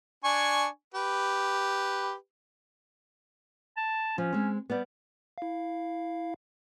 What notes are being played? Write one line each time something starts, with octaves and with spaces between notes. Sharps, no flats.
D4 G#5 C#6
G4 B4
A5
F3 C#4
G#3 C4
G3 B3 D5
E4 F5